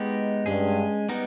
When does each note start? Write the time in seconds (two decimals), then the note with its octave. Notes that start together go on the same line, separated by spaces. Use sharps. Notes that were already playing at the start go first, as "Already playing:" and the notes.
Already playing: G#3 B3 D#4 G4
0.46 G2 G#3 C#4 G#4
1.09 G3 B3 D#4 A#4